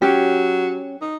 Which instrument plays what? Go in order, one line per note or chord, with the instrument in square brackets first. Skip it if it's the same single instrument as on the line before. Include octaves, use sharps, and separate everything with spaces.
[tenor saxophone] F#3 [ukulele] C#4 G4
[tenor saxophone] D#4